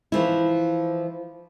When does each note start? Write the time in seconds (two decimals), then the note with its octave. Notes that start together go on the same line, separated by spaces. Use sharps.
0.12 E3 F3 E4